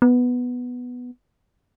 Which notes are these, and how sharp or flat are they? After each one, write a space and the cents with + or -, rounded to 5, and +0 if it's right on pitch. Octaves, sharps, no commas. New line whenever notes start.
B3 +0